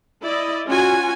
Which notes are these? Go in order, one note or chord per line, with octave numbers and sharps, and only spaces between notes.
E4 D5 D#5
C#4 F4 F#4 G#5